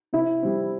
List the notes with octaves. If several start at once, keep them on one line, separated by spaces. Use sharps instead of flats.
C3 E4
G3 C4